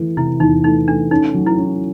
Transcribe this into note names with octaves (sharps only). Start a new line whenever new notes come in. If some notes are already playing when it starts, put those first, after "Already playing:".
Already playing: E3 A3
C3 E4
E2 D#4
A3 D#4
A3 D4
C#4 D#4
F#3
E4
C#4